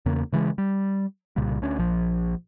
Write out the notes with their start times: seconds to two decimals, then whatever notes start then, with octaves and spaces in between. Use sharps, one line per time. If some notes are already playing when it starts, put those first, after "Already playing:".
0.06 E2 C#3 A#3
0.32 C#3 E3 F#3 G#3
0.58 G3
1.36 C2 A#2 C#3 G3
1.62 D2 D3 C#4
1.79 A#1 F3